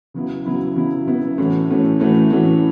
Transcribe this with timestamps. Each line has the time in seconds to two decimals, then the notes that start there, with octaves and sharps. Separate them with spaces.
0.14 C#3 F#3 B3 E4
0.46 C#3 F#3 B3 E4
0.76 C#3 F#3 B3 E4
1.07 C#3 F#3 B3 E4
1.38 A2 E3 A3 C#4 F#4
1.68 A2 E3 A3 C#4 F#4
2.00 A2 E3 A3 C#4 F#4
2.30 A2 E3 A3 C#4 F#4